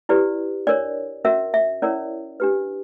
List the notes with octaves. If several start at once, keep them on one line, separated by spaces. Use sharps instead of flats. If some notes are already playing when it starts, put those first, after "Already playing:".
E4 G4 B4 D5
D4 A#4 C#5 D5
C#4 F#4 A#4 E5
E5
C#4 E4 A#4 C#5 D5
D4 G4 B4